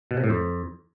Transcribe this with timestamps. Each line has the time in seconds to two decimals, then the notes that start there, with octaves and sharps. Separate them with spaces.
0.11 B2
0.17 C3
0.24 A2
0.30 F2